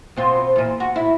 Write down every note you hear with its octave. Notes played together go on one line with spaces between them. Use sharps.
B2 C4 F4
E2 A#2
F#4
E4